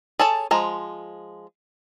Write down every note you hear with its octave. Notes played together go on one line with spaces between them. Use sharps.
G#4 A4 C#5 A5
F3 G#3 A#5